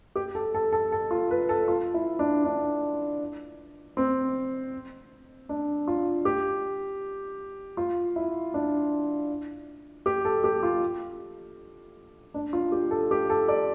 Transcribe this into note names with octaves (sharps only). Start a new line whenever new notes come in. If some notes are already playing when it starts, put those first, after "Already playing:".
G4
A4
A4
A4
A4
F4
B4
A4
F4
E4
D4
D4
C4
D4
F4
G4
F4
E4
D4
G4
A4
G4
F4
D4
F4
G4
A4
G4
A4
D5